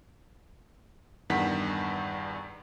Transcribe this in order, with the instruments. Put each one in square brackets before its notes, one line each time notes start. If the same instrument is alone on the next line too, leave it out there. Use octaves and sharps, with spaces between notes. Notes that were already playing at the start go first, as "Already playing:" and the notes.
[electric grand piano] E2 G2 D#3 F#5 B6